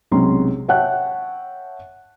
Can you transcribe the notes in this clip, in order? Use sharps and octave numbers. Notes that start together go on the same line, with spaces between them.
B1 C3 G#3 C#4 A#5 C6
C#5 E5 F#5 G5 A5 F#6